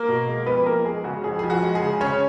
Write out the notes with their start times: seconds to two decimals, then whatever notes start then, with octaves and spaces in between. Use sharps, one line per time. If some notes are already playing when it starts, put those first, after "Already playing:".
Already playing: A#3 A#4
0.08 B2
0.28 G#3
0.46 F2 B3 B4
0.66 F3 A#3 A#4
0.85 G#3 G#4
1.04 C#3 F#4
1.24 F2 G#4
1.39 F3 G#4
1.50 F#4
1.62 G#3
1.75 G#4
1.81 C#3
2.01 C#3 C#4 C#5